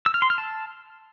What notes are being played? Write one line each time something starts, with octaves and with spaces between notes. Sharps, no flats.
E6
F6
C6
F6
A5